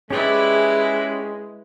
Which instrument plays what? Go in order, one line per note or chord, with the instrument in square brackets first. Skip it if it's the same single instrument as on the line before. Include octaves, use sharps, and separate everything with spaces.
[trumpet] G#3 [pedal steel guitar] C#4 G4 D5 [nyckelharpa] E4 B4 [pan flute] G#4